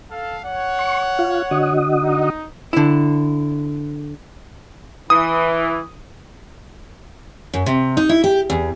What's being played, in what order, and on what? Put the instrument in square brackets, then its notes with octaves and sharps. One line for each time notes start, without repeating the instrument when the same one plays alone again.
[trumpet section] A4 F5
C#5 F#5
[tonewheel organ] C#6
F4
D3 F#4 D#5
[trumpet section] D#4
[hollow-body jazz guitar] D3 E4
[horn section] E3 [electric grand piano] D#6
[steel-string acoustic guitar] F#2
C3
D#4
E4
G4
E2